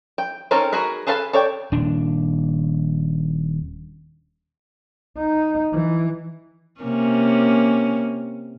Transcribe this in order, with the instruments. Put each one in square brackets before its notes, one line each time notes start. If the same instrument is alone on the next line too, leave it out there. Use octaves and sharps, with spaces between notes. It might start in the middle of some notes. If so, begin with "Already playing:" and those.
[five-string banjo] G5
C4 C#4 D#4 A4 A#4
D#4 F#4 G#4 A#4 B4
G#4 A4 B4 F5 A5
A4 C#5 D5 G5
[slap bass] D#1 D4
[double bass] D#4
E3
[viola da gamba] C3 A#3 C#4